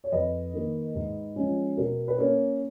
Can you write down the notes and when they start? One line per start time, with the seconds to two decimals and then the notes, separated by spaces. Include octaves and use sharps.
0.04 C#5
0.12 F2 B4 D#5
0.53 D#3 A#3
0.95 G#2
1.36 F3 G#3 C#4
1.77 B2 A#4
2.08 B4
2.18 A#3 C#4 A#4 C#5